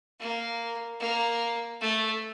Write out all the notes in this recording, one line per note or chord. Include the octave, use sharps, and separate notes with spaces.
A#3
A#3
A3